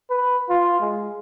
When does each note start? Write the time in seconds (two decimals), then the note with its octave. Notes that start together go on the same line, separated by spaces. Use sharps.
0.10 B4
0.49 F4
0.81 G#3